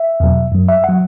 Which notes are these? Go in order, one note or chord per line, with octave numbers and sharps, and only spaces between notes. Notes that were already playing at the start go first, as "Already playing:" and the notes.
Already playing: E5
E2 B2 F#3
F#2 F#3
E5
F#3 F#5